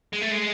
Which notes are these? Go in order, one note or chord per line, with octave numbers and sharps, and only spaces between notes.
G#3
A3
G#3